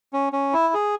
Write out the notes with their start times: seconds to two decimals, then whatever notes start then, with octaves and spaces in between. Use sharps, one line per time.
0.13 C#4
0.33 C#4
0.53 E4
0.74 G#4